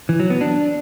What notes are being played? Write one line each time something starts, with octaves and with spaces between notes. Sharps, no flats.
E3
F#3
B3
D4